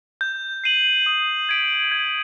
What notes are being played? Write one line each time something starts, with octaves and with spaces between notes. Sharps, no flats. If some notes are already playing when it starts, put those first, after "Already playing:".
G6
C7 D#7 F#7
D#6
G#6 B6 D7
G#6